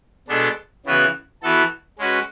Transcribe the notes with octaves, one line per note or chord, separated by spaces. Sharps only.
B2 G#3 B3 D4 A4
C#3 E3 B3 F#4 B4
E3 B3 F#4 A4
G#3 C#4 F#4 B4